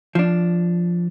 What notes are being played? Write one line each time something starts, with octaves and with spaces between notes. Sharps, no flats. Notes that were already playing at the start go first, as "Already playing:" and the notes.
F3 D4